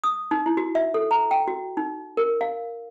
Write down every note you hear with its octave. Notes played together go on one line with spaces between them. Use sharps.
D#6
D#4
E4
F#4
E5
A4
A#5
G5
F#4
D#4
A#4
F5